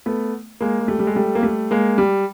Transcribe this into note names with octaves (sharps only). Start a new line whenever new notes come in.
A3 B3
G#3 A#3
G#3
G3 A3
G3
G#3
G3 A3
A#3
G3 A3
G#3 A#3
G3